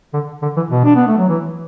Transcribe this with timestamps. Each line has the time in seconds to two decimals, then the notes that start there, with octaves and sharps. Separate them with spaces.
0.13 D3
0.42 D3
0.56 E3
0.70 B2
0.84 D4
0.95 B3
1.07 A3
1.18 F#3
1.29 E3